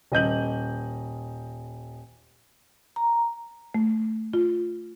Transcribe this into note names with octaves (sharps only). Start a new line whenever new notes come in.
D#1 D#5 G6 F#7
A#5
A3
F4